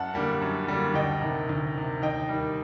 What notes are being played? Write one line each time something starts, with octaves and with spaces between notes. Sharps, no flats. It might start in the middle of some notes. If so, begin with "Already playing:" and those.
Already playing: F#2 F#5 A5
D3 G3 A#3
F#2
D3 G3 A#3
D2 D#5 G5
C3 D#3
D2
C3 D#3
D#2 D#5 G5
D#3 G3